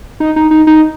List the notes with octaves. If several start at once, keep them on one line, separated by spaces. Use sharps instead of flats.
D#4
D#4
D#4
D#4